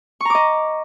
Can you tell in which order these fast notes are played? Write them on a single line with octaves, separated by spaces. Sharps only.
C#6 A#5 D6 D#5